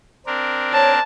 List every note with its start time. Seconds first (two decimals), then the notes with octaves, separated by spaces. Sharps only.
0.27 C4 D4 A#4
0.73 C#5 A5